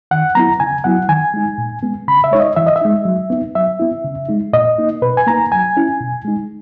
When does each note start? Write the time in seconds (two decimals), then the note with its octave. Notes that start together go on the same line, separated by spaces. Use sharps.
0.11 D#3 F#5
0.35 F#3 B3 E4 A#5
0.60 C#3 G#5
0.84 F#3 B3 E4 F#5
1.09 D#3 G#5
1.34 G#3 D#4
1.58 A#2
1.83 G#3 B3
2.08 C#3 B5
2.24 E5
2.32 G#3 D#4 C#5
2.40 D#5
2.57 E3 E5
2.67 D#5
2.76 E5
2.82 G#3 D#4
3.05 F#3
3.30 B3 D#4
3.55 F#3 E5
3.80 B3 E4
4.04 C#3
4.29 G#3 D#4
4.53 A#2 D#5
4.78 A#3 D#4
5.02 B2 B4
5.17 G#5
5.27 A#3 D#4 A#5
5.52 F#3 G#5
5.77 C#4 E4
6.01 B2
6.25 G#3 D#4